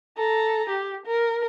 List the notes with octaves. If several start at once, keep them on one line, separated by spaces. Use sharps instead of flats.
A4 A#5
G4
A#4